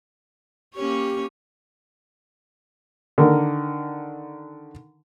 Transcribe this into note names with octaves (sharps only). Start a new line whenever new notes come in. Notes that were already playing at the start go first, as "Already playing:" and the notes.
A#3 C#4 G4 C#5
D3 D#3 A#4